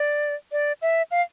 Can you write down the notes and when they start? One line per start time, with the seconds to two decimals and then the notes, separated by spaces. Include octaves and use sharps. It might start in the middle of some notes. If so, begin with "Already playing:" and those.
Already playing: D5
0.52 D5
0.82 E5
1.11 F5